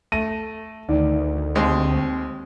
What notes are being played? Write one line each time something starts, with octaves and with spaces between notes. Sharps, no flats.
A3 A#6 D#7
D2 D#3 D5
D#2 G#3 C4 C5